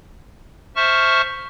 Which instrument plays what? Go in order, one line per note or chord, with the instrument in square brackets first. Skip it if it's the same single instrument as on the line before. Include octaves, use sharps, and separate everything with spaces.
[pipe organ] C5 E5 A5 C#6 F6